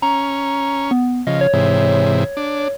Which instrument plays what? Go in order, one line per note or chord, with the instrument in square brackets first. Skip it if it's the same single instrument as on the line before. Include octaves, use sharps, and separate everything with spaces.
[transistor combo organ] C#4 [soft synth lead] A#5
[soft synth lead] B3
[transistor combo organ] C#3 F3 [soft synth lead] D#5
[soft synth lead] C#5
[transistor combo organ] G#2 C3 E3
D4